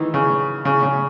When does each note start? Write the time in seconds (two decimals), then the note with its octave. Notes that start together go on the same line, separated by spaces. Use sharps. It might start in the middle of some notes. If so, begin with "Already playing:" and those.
Already playing: D#3 E3
0.14 C#3
0.65 C#3
0.83 C#3